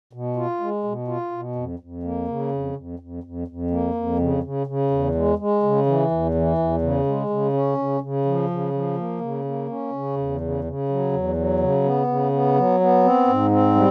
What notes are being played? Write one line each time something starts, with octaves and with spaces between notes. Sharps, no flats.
B2
F4
G#3
B2
F4
B2
F2
F2
A#3
C#3
F2
F2
F2
F2
F2
A#3
F2
C#3
C#3
C#3
E2
G#3
G#3
C#3
E3
E2
E3
E2
C#3
G#3
C#3
C#4
C#3
C#3
F3
C#3
F3
A#3
C#3
A#3
C#4
C#3
E2
C#3
C#3
F#3
E2
F#3
C#3
B3
C#3
B3
F#3
B3
C4
G#2
C4
G3